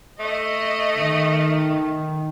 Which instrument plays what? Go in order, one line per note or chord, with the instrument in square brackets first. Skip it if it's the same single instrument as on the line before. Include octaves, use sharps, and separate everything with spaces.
[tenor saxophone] A3 [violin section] D#5
[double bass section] D#3